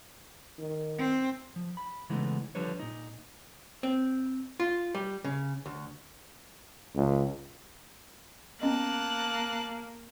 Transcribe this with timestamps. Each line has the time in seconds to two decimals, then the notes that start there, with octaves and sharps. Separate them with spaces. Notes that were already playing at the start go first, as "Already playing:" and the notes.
0.59 D#3
0.98 C4
1.56 F3
1.77 B5
2.10 C#3 E3 G#3 A3 B3 D#4
2.55 D3 F3 G3 B4 C#5
2.79 A#2 D#4
3.83 C4
4.60 F4
4.95 G3
5.25 C#3
5.66 D2
6.95 C#2
8.61 A#3 B3 C#4 D#5 A5 F#6